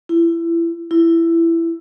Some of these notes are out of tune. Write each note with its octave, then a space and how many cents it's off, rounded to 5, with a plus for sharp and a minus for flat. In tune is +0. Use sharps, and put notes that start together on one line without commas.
E4 +25
E4 +15